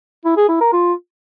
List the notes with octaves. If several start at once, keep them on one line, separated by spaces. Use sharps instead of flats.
E4
G#4
E4
A#4
F4